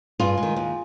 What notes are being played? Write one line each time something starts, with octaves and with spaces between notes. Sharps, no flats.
G2 F4 G#4
G#3
D#3
D#2